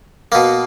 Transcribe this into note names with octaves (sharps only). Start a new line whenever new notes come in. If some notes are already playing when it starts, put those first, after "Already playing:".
B2 A#3